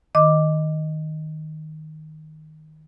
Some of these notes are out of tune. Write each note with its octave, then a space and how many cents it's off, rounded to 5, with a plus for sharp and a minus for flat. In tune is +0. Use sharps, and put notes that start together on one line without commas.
D#3 +0 D#5 +0 D6 +0